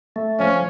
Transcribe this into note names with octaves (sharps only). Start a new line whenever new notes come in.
A3
F3 C#4